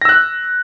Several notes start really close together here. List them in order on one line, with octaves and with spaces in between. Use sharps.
A#6 E6 F#6